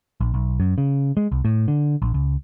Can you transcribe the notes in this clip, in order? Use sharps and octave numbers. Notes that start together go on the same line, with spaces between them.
A#1
B1
F#2
C#3
G#3
C2
A2
D3
A#1
C#2